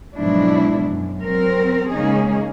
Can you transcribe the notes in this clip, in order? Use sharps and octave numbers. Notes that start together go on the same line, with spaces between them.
G#2 B2 F3 F#3 D4 E4
F#2
F#3 C4 A#4
C#3 G#3 A#3 C#4 D#4 G#4